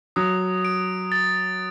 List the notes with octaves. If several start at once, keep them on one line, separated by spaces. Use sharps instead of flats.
F#3 D#6
D7
A6